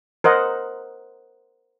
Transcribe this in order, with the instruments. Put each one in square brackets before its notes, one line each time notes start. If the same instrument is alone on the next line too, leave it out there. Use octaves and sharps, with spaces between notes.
[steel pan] A#4 C5 D#5 F#5